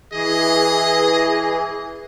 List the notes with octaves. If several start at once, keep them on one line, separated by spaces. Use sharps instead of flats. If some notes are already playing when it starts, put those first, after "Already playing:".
E3 G#4 D#5